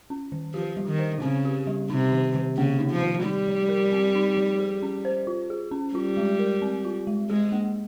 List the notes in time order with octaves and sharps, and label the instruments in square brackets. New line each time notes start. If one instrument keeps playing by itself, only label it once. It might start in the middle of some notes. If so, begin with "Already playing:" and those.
[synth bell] C#4
D#3
[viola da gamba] F3 [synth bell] G4
[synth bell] G3
[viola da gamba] D#3
[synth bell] C5
[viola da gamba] C#3 [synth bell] C4
[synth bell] G4
G3
[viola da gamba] C3 [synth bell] D#4
[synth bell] D#3
D#3
[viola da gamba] C#3 [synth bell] A#3
[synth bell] D#4
[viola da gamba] F3
[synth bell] D#3
[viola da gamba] G3 [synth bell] D#4
[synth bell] F3
A#4
C4
D#4
F3
G#4
C#4
C5
F4
G#4
C#4
[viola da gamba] G3 [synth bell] F4
[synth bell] G#3
A#4
C4
F4
G#3
[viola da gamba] G#3 [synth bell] G#4
[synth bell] A#3